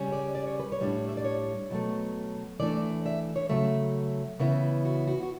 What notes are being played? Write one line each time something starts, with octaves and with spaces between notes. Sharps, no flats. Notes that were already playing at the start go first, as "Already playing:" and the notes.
Already playing: C#3 G3 C#4
D5
D5
C#5
B4
C#5
A2 G3 D4
E5
D5
C#5
B2 F#3 A3
E3 A3 D4 D5
E5
C#5
C#3 F#3 A3 E5
C#3 E3 B3 E4 E5
F#4
F#4
F#4